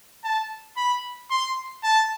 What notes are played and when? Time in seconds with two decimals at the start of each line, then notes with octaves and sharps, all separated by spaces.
0.24 A5
0.77 B5
1.30 C6
1.83 A5